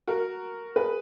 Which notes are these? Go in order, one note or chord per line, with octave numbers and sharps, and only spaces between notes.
F#4 A#4
G#4 B4